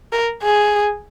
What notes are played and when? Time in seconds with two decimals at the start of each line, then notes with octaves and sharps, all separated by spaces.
0.13 A#4
0.43 G#4